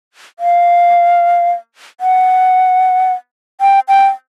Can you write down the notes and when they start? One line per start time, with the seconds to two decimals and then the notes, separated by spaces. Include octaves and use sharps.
0.39 F5
2.01 F#5
3.61 G5
3.88 G5